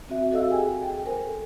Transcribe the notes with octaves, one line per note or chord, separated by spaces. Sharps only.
C4 F#4 E5
F#4 A4 D#5 F5 E6
G4 G#4 G5 G#5
G#4 G5
A#4 C5 G#5
A4